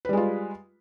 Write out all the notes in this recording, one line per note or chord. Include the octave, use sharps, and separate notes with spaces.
G3 G#3 F4 B4